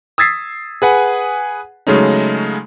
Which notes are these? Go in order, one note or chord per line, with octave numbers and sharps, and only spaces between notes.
D#6 E6 G#6 A6 B6 C7
G#4 B4 F#5 G#5
C#3 F#3 G#3 A3 C#4 D#4